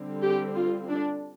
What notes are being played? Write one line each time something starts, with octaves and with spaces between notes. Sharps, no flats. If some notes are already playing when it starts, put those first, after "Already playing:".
Already playing: D3 G3 C4
G4
F4
D4